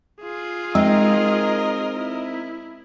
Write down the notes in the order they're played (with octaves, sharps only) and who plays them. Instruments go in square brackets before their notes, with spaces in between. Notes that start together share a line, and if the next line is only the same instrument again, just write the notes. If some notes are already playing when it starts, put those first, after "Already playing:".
[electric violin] F4 G#4
[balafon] G#3 [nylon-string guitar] C4 D#4 [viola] A#4 D#5
[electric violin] E4